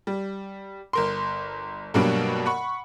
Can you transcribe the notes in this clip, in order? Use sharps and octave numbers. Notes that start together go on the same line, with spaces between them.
G3
G1 A#4 C6
G2 B2 F#3 G3 A#3 D4
F#5 B5 C#6